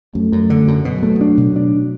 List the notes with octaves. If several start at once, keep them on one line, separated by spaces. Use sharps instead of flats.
F#2 A3
F#2
D3
F#2
B2 F#3
A3
D4
B2
D4